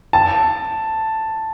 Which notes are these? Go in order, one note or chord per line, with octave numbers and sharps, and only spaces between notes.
A5